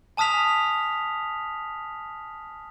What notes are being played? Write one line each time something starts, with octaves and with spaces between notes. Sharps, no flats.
G#5 A5 D#6 F6 B6 F7